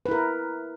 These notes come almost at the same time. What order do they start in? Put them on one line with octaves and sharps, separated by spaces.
B4 E4 A#4